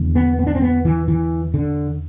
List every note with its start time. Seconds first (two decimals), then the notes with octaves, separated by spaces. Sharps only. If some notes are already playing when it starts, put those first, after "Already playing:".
Already playing: E2 D3
0.15 B3
0.39 B3
0.47 D4
0.55 C4
0.62 B3
0.85 E3
1.08 E3
1.54 D3